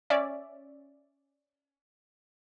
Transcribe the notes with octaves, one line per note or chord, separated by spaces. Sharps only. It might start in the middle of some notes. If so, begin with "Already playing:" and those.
C#4 D5 E5